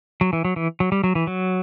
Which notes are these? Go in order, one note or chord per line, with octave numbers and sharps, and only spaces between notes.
F#3
E3
F#3
E3
F#3
G3
F#3
E3
F#3